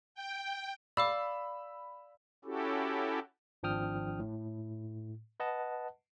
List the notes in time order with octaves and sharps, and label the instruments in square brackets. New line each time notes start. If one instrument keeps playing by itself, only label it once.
[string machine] G5
[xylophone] D5 F5 D6 [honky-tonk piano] B5 E6
[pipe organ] C#4 E4 F#4 G4 A4
[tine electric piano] G#1 F3 D4 G5 D#6 F6
A2
B4 D#5 F#5 A5